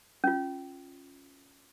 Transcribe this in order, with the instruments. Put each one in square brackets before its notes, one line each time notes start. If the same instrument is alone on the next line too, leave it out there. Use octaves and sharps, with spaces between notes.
[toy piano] C#4 F4